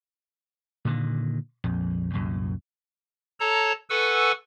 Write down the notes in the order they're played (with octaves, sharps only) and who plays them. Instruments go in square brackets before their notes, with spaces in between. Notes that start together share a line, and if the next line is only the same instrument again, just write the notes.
[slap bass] A#2 D3 D#3
A#1 F2
C2 F#2 A#2
[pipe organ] A4 C#5 A5 A#5
A4 B4 F#5 G#5 C#6 E6